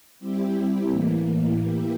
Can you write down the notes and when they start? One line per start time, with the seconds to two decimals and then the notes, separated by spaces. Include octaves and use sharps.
0.19 G3 C4 E4 G4
0.89 A2 E3 A#3
1.58 E3 A#3 E4 G4